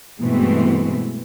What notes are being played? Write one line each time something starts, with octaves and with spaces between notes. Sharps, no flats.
G2 B2 E3 G#3 A3 C4